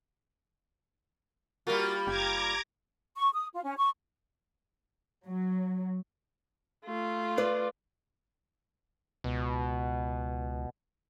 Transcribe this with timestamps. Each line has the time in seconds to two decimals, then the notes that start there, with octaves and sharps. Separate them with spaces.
1.67 G3 A#3 F4 F#4 A#4
2.07 F#1 G4 A#5 D6 G#6
3.16 C#6
3.34 D#6
3.53 F4
3.65 C#4
3.77 C#6
5.26 F#3
6.85 A3 F4
7.38 B4 D5
9.24 C#2 B2